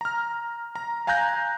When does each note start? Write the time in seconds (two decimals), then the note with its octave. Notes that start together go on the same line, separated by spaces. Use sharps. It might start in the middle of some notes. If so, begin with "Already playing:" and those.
0.01 A#5 F6
0.76 A#5
1.07 F5 G#5 A#5 F#6 G6 A#6